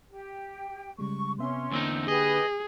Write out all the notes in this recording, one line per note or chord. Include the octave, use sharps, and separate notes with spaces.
G4 G5
C#3 G3 G#3 C#6
C3 B3 C#4 E5 C6
E2 D3 A#3 C4 D4 D#4
G4 G#4 B4 D#5